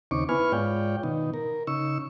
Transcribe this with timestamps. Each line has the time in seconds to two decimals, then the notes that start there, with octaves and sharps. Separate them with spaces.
0.11 D#2 C#3 C4 D#4 C#6 D6
0.29 B3 E4 B4 G#5 C#6 F6
0.52 G#2 F4 C#5 D5 G5
1.03 B2 D#3 D#4
1.34 A#4
1.67 C#3 D#4 C#6 E6